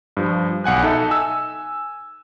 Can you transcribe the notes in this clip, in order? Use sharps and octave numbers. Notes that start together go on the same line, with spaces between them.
G2 F3
B1 F#5 G#5 F#6
D#4 A4 E5
G#5 E6